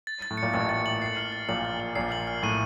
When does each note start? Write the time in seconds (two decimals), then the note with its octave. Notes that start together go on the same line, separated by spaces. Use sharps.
0.07 A6
0.22 A6
0.31 A2
0.37 C#7
0.43 A#2
0.53 A1 A2 A6
0.69 A6
0.86 F#7
1.02 C7
1.17 F6
1.32 A6
1.48 A#1 A#2 F#7
1.65 F6
1.80 F#7
1.95 A#1 A#2 C7
2.12 F#7
2.27 F6
2.43 A2 D#7